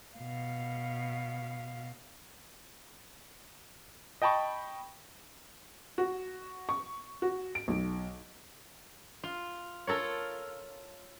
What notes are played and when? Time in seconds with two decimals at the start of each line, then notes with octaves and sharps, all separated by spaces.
0.17 B2 F5
4.22 D#5 G5 A5 B5 C#6
5.98 F#4
6.69 C#6
7.22 F#4
7.55 D7
7.68 B1
9.23 F4
9.87 F4 A4 A#4 C#5